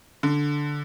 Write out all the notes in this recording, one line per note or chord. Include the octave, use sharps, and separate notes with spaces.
D3